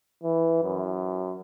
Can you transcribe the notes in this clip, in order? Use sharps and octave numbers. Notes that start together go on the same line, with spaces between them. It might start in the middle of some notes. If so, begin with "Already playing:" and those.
E3
F#2